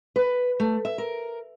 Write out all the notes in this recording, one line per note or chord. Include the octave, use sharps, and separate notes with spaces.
B4
A3
E5
A#4